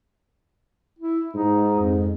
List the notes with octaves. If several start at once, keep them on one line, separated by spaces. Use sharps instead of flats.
E4
G#2 D#4
F2